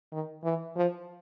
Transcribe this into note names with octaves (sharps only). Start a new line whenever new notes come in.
D#3
E3
F3